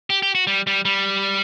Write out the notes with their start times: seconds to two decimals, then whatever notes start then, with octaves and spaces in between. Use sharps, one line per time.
0.10 G4
0.22 G4
0.35 F#4
0.47 G3
0.67 G3
0.85 G3